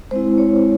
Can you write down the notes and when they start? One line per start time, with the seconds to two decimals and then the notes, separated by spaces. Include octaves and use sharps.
0.11 G#3 C4 E4 C5
0.38 C#5